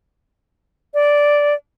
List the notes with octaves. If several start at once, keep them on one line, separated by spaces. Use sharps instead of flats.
D5